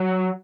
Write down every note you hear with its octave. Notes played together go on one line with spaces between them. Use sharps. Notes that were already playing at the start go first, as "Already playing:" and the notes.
Already playing: F#3